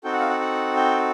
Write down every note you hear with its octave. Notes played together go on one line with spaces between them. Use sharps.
C4 D#4 F#4 A4 G5
F#5
F5
F#5
F#5
G5